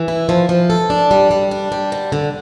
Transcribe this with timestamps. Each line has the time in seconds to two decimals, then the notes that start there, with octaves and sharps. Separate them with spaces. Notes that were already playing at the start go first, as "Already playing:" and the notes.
Already playing: E3
0.08 E4
0.29 F3
0.49 F3
0.70 A4
0.90 D4
1.11 G3
1.31 G3
1.51 D4
1.72 G3
1.92 D3
2.12 D3